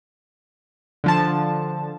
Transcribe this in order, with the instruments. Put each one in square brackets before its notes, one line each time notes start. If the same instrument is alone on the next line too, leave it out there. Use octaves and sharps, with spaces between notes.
[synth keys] D3 F3 A5